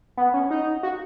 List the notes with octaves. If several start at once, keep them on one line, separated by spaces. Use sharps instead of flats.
B3 F#5
C#4
D#4
F#4 F5